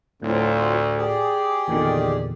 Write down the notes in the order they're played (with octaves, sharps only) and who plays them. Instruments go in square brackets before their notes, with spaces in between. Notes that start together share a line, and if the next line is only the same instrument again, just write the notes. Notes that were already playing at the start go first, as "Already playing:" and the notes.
[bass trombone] D2 [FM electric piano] A2 [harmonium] F#3 C4 F4
[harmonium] G4 G#4 D5
[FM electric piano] E2 A#2 D3 [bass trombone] D#3